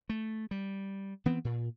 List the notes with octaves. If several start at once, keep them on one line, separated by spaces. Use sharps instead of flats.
A3
G3
E3 B3 C4
A#2